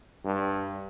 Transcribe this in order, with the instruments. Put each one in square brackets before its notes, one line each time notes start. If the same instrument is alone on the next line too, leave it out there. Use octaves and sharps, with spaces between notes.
[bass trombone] G2